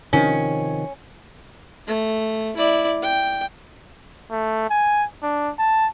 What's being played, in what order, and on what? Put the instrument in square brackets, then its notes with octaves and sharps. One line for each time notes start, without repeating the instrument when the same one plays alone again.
[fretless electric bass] C3 D#3 F3 [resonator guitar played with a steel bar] C#4
[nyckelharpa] A3
E4 D5
G5
[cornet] A3
G#5
D4
A5